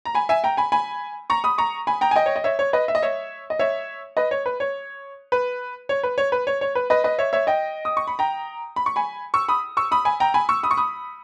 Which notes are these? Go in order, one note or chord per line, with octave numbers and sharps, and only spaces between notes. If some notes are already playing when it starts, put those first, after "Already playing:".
A#5
G#5 B5
E5 G#5
G5 A#5
G#5 B5
G#5 B5
A#5 C#6
B5 D#6
A#5 C#6
G#5 B5
G5 A#5
G#5
D#5 G5
C#5
D#5
C#5 E5
C#5
B4 D#5
E5
D#5
C#5 E5
D#5
C#5 E5
B4 D#5
C#5
B4
C#5
B4
C#5
B4
C#5
B4
C#5
C#5
B4
B4 D#5
B4 D#5
C#5 E5
C#5 E5
D#5 G5
D#6
C#6
B5
G5 A#5
B5
C#6
G#5 B5
C#6 E6
B5 D#6
C#6 E6
B5 D#6
G#5 B5
G5 A#5
G#5 B5
C#6 E6
B5 D#6
C#6
B5 D#6